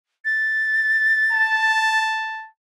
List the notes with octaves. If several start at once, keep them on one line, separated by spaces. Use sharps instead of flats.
A6
A5